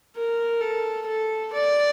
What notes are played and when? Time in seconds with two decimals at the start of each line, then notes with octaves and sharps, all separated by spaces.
0.17 A#4
0.61 A4
1.07 A4
1.53 D5